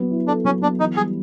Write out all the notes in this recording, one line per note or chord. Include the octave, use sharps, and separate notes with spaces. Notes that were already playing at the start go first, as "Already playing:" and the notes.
Already playing: F#3 B3
E4
D4 A4
F#3 C#4
B3 D4
E3 D#4
G3 G#4